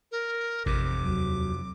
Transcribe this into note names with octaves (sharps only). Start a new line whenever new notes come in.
A#4
A1 F2 C3 D6
D#2 F#3